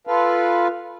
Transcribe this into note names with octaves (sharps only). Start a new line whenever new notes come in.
F4 A4 B4 F5